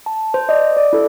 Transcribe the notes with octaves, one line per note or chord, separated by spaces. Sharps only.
A5
C5
D5 D#5
D5
E4 A4